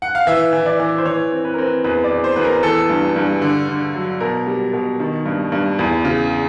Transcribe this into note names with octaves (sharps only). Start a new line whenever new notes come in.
F#5
F5
E3 E5
E3
D5
E3
C5
E3 C#5
C4
B4
A#4
C4 B4
E2 B4
D5
E2
C5
E2 B4
A#4
E3 A4
G2
G2
D3
D3
F#3
B2 A#4
G3
B2
D#3
G2
G2
E2
C#3